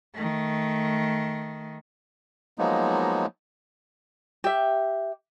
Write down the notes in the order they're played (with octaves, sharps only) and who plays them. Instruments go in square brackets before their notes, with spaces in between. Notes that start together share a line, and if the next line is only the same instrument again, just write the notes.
[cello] D#3 A3
[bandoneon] F3 F#3 G#3 A#3 B3 D#4
[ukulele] G4 E5